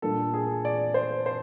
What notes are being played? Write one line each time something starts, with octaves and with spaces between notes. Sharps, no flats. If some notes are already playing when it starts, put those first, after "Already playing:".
A#2 G3 A#3 D4 A4
G#4
D5
C5
C5